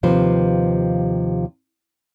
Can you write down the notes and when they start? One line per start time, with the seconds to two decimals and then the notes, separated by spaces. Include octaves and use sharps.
0.03 D#2 C3 F3 B4 C5